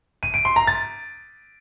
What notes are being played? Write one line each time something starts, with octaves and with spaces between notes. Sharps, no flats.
D#7
D7
C6
A#5
A6